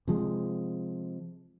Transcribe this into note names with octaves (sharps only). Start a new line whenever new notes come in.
C3 F3 G#3